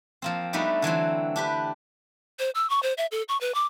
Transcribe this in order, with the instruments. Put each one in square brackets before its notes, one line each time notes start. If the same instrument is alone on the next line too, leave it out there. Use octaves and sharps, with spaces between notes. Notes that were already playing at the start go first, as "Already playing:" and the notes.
[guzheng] F3 A#3 C4
G3 A3 B3 D4 D#4 F#4
D3 E3 F#3 C4
D4 G4 B4
[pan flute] C5
E6
C#6
C5
E5
A4
C#6
B4
D6